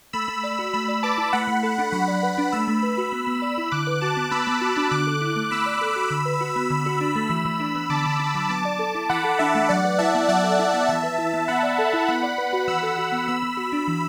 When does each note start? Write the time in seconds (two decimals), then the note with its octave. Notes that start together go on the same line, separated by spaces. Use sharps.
0.13 A3 B5 E6
0.28 A3
0.43 D5
0.59 F#4
0.73 A3 B5 E6
0.88 D5
1.03 B4 A5 D6
1.18 E4
1.33 A3 F#5 B5
1.48 A3
1.63 A4
1.78 D4
1.92 F#3 F#5 B5
2.08 D5
2.23 B4
2.38 D4
2.52 A3 B5 E6
2.68 A3
2.83 B4
2.97 F#4
3.12 B3
3.27 B3
3.42 D5
3.58 E4
3.71 D3 D6 F#6
3.87 B4
4.01 F#4 A5 D6
4.17 B3
4.31 B3 B5 E6
4.47 B3
4.61 F#4
4.77 D4
4.91 D3 D6 F#6
5.07 A4
5.21 E4
5.36 A3
5.51 B3 B5 E6
5.66 D5
5.81 A4
5.96 F#4
6.11 D3
6.25 B4
6.41 F#4
6.56 B3
6.70 D3
6.86 F#4
7.01 D4
7.16 A3
7.30 E3 B5 E6
7.45 E3
7.60 D4
7.75 B3
7.90 D3 A5 D6
8.05 D3
8.20 D4
8.35 F#3
8.49 B3 A5 D6
8.65 D5
8.79 A4
8.95 E4
9.09 E3 F#5 B5
9.24 A4
9.39 D4 E5 A5
9.55 A3
9.69 F#3 D5 F#5
9.85 B4
9.99 E4 E5 A5
10.14 B3
10.29 F#3 D5 F#5
10.44 A4
10.59 E4
10.74 B3
10.89 E3 E5 A5
11.03 B4
11.18 E4
11.34 B3
11.48 B3 F#5 B5
11.63 D5
11.78 A4
11.93 E4
12.08 B3 F#5 B5
12.23 D5
12.38 B4
12.53 F#4
12.68 E3 B5 E6
12.83 A4
12.98 F#4
13.12 B3
13.28 B3 B5 E6
13.42 B3
13.57 F#4
13.72 D4
13.88 E3